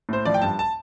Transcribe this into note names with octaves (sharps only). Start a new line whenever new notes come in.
A2 C5
F3 D5
G5
G2 A5
A5